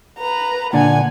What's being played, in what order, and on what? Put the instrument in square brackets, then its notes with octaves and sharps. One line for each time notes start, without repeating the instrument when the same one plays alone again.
[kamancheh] B4 A#5
[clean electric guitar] A#2 D3 D4 [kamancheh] F#5 G#5